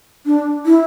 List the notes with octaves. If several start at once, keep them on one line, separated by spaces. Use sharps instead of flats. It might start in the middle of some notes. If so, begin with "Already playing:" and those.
D4
E4